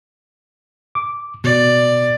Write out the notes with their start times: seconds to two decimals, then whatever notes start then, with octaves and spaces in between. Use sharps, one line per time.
0.95 D6
1.44 B2 D5